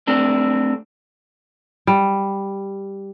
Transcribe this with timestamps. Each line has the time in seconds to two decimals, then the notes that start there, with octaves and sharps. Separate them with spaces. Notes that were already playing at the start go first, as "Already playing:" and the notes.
0.07 A3 C4 D4
1.87 G3